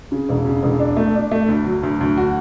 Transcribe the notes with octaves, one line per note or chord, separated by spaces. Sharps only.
C#3
E1
C#3
E1
D4
A3
D4
A3
D2
F#3
D2
D2
F#4